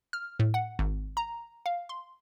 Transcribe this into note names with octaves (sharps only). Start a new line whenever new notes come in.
F6
A2
F#5
G#1
A#5
F5
C6